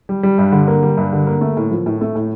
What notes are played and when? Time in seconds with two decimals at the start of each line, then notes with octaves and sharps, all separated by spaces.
0.09 G3
0.23 G3
0.38 G2
0.52 D3
0.68 A#3
0.83 G3
0.97 G2
1.12 D3
1.27 A#3
1.41 A3
1.57 A2
1.71 F3
1.86 A2
2.01 A3
2.15 A2